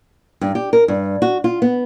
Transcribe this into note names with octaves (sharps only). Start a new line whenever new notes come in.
G2
G4
A#4
G2
F#4
F4
B3